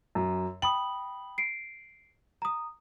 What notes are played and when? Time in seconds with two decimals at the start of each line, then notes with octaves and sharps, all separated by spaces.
0.15 F#2
0.62 G5 B5 D#6 F#7
1.38 C7 D7
2.42 A#5 D#6